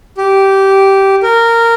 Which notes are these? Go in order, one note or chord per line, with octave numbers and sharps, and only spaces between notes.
G4
A#4